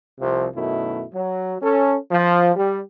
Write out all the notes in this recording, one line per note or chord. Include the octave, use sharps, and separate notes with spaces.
C2 C3 F3
F#2 B2 D#3 A3 E4
F#3
C#4 A4
F3
G3